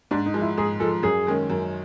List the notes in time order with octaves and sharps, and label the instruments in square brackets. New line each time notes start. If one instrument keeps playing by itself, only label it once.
[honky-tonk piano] G#2 [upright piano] D4
[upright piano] D#4
[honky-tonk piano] F3 G#3
[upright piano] E4
[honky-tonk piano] G#2 [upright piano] G#4
[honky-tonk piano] F3 G#3 [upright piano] A4
[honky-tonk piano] F#2 [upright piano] G#4
[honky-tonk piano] D#3 G#3 C#4
F#2